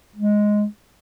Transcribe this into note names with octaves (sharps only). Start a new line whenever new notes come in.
G#3